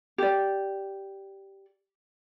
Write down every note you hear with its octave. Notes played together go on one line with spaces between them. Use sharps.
G4 D5